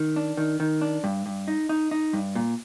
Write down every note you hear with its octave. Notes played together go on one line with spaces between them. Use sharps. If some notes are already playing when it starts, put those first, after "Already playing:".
Already playing: D#3
D4
D#3
D#3
D4
G2
G2
D#4
D#4
D#4
G2
A#2